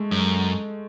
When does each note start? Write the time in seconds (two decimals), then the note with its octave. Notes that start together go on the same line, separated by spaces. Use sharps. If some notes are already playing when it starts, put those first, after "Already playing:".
Already playing: G#3 A3
0.11 F#2